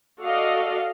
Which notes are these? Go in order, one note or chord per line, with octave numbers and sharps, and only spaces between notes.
F#4 A4 D5 D#5 F5